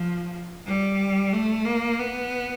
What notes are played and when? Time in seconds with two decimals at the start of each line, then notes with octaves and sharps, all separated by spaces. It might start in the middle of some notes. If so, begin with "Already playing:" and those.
Already playing: F3
0.67 G3
1.33 A3
1.65 A#3
2.00 B3